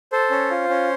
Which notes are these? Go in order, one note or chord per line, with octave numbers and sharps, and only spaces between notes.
A4 C5
C#4
F4
C#4